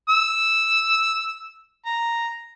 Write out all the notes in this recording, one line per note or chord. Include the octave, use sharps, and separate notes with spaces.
E6
A#5